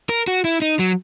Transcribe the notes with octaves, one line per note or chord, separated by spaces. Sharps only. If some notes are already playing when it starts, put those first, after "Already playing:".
A#4
F#4
E4
D#4
F#3